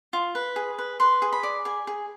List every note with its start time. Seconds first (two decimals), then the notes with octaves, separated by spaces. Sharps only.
0.13 F4
0.35 B4
0.56 G#4
0.78 B4
1.00 B4 C6
1.22 G#4
1.32 B5
1.43 D5
1.65 G#4 G#5
1.87 G#4